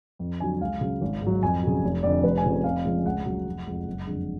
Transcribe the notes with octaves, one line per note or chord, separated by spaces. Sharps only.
F2
D3 F#3 G#5
C#2 F5
C#3 F#3
G#1
G#2
F#3
F2 G#5
C#3 F#3
F1
F2 D3 D5
F1 B4
G#5
F2 C#3 F3
F2 F5
C#3 F3 G#3
C#2 F#5
C#3 F#3
F1
F2 F3 G#3
F#1
F2 D3 G#3